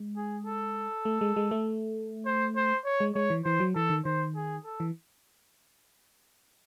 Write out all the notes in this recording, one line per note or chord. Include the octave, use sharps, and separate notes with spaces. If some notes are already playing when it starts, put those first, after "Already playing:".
Already playing: G#3
G#4
A4
A3
G#3
G#3
A3
C5
C5
C#5
G#3
G#3 C#5
E3
E3 C5
F#3
E3 A4
D#3
D#3 C5
G#4
A4
E3